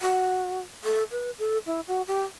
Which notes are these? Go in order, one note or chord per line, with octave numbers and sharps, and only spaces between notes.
F#4
A4
B4
A4
E4
F#4
G4